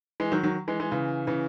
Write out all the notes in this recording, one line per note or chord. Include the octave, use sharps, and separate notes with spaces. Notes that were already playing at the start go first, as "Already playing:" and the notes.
E3 G#3
D#3 F#3
D#3 F#3
E3 G#3
E3 G#3
C#3 E3
C#3 E3